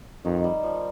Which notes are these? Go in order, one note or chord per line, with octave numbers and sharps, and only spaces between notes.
F2 D#3
G3
F3